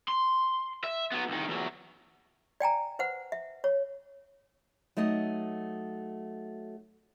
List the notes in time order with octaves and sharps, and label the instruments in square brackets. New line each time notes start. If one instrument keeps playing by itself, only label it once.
[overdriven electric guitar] C6
E5
F#3 B3
C2 D#3
E2 F#3
[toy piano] D5 G5 G#5 A#5
B4 C5 F#5
E5
C#5
[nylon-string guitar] F#3 A3 D#4 D#5